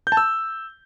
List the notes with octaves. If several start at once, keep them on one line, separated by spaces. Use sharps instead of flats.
G6
A5
E6